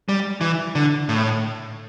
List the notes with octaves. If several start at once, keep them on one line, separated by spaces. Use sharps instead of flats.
G3
E3
D3
A2